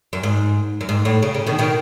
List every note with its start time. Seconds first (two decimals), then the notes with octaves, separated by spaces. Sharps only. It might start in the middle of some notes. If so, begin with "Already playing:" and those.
0.13 F#2
0.23 G#2
0.81 F#2
0.89 G#2
1.05 A2
1.23 C#3
1.34 C#3
1.47 B2 D#3
1.59 B2 D#3